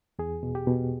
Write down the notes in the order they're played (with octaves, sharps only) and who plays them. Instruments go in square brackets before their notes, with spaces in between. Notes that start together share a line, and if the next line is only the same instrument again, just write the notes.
[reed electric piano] E2 G#4
B2
G4
B2